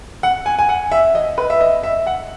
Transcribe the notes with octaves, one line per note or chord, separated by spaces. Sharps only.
F#5
G#5
G#5
F#5
E5
D#5
B4
E5
D#5
E5
F#5